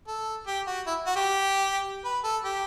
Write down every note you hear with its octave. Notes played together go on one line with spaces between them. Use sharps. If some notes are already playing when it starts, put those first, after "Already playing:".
A4
G4
F#4
E4
F#4
G4
B4
A4
G4